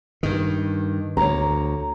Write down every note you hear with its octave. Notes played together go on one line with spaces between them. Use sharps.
G2 D#3
D2 C#5 A#5